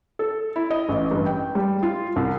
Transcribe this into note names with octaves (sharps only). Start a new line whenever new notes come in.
A4
E4
D#5
A1
G2
G5
G3
F4
C2